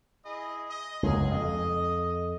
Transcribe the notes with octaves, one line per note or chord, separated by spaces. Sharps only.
E4 G#4 D#5
D#5
C#2 F#2 G#4
F2 D#5